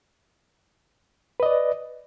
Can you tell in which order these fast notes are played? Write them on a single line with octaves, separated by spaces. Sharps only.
B4 D#5 D5